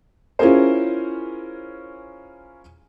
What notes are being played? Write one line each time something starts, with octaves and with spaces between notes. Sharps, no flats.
C#4 E4 F4 G#4 A#4 C5